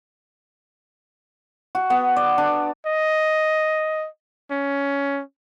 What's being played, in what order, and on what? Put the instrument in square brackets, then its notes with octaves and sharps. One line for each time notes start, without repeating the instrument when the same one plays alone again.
[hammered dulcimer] F#4
B3
D5
D4
[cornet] D#5
C#4